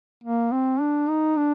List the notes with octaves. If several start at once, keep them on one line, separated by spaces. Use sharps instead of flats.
A#3
C4
D4
D#4
D4